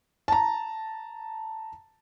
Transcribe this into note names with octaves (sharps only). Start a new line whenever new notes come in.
A5 A#5